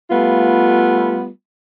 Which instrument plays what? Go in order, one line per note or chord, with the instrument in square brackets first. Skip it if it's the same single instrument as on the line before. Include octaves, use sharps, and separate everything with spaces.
[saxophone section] G3 A3 B3 F4